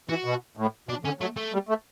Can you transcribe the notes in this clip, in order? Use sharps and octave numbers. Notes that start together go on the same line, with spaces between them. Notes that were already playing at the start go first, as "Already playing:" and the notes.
E3 F#4
B2
A2
B2 D4
D3 C#4
F#3 A3
A3
G3
A3